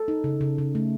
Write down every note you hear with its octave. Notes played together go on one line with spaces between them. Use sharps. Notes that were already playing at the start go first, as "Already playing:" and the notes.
Already playing: A4
D#4
C#3
C#3
C#3
A3